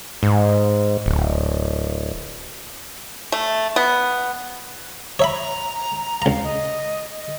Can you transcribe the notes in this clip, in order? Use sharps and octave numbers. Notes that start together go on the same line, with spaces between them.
G#2
D1
A3
B3
C#5 E5 A#5 B5
C#2 F5 A#5
D#5
D#5